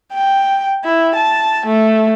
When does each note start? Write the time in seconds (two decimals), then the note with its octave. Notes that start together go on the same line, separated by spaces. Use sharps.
0.13 G5
0.84 E4
1.15 A5
1.66 A3